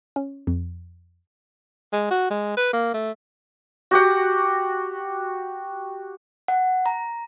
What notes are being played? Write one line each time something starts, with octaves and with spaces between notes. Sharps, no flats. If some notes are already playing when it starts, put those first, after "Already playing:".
C#4
F2
G#3
F#4
G#3
B4
A#3
A3
F#4 G4 F#5
F#5
A#5